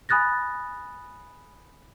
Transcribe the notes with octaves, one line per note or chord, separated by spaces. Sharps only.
G#5 B5 D#6 F#6 A6 A#6